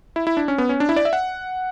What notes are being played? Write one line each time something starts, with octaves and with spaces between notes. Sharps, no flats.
E4
E4
D4
C#4
B3
C#4
D4
E4
D5
E5
F#5